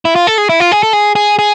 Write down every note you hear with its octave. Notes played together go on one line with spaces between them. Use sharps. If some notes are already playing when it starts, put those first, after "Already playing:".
E4
F4
A4
G#4
E4
F4
G#4
A4
G#4
G#4
G#4